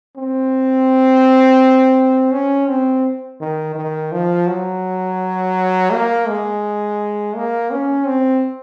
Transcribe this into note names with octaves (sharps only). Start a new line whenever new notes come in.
C4
C#4
C4
D#3
D#3
F3
F#3
A#3
G#3
A#3
C#4
C4